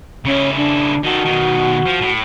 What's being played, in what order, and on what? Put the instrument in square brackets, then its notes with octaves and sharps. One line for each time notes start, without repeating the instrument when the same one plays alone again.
[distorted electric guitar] C#3 E4 [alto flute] C#4
[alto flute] D4
[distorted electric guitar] D#3 A4 [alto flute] F#4
[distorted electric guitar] B2 D#3
F3
A2